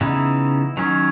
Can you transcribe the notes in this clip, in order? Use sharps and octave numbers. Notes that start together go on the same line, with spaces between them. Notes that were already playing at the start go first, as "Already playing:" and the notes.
C#3 E3 B3 D#4 E4
D#3 F#3 C#4